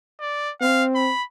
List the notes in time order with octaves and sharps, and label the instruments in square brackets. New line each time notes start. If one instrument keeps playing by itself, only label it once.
[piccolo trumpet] D5
[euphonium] C4 [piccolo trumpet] F5
[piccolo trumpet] B5